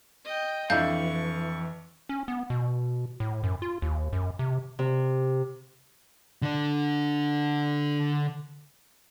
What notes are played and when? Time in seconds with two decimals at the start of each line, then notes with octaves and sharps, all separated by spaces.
0.25 D#5 G5
0.70 F2 E3 D4 E4 F5 A5 C#6 G6
2.09 C#4
2.28 B3
2.50 B2
3.20 A2
3.44 F#2
3.62 F4
3.82 D#2
4.13 F#2
4.39 C3
4.79 C3
6.42 D3 D4